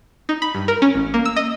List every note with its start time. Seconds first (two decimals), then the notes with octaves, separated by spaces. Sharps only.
0.29 D#4
0.42 B5
0.55 G2
0.68 A#4
0.82 C#4
0.95 A1
1.14 A#3
1.25 E6
1.36 D#5